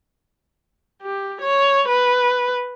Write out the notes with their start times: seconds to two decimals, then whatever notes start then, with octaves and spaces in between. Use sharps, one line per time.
1.02 G4
1.41 C#5
1.88 B4